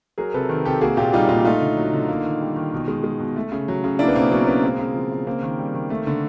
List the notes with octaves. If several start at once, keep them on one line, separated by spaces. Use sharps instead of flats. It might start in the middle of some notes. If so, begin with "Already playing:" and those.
F#3 G#4 A#4
C3 A4 B4
D#3
C3 G4 A4
A#3 F#4 G#4
A#2 F4 G4
G3 D#4 F4
A#2 D#4 F4
A3 D#4 F4
D3
F#3
D3
A#3
D#3
G3
D#3
B2
G#3
G#3
B2
A3
C#3
F#3
C#3
A#3 D4 E4
B3
B2 A#3 C4
F#3 B3 C#4
B2 B3 C#4
G#3 A#3 C4
C#3
F3
C#3
A#3 C4
D#3
G3
D#3
A3
D3